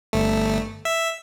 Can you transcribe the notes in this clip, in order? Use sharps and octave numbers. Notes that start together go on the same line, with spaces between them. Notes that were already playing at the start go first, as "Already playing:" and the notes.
G1 A3
E5